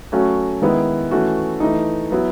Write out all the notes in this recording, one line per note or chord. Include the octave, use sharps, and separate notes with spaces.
F#3 A3 C#4 F#4
D#3 G#3 B3 E4
E3 A3 C#4 F#4
E3 A3 D#4
F#3 B3 E4